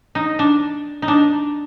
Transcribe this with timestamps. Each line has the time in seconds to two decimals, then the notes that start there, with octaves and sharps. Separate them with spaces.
0.15 D#4
0.39 D4
1.02 D#4
1.08 D4